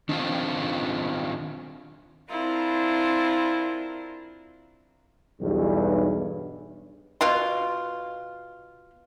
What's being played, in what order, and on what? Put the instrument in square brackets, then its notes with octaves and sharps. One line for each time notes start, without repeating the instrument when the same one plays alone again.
[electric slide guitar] D#3 C4 F4 [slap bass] D4
[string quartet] C4 D4 E4 F4 A#4
[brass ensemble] B1 E2 G2
[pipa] B2 F4 C6